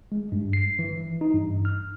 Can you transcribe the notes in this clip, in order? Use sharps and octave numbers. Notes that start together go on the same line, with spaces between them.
G#3
G2
C7
E3
D#4
G2
F6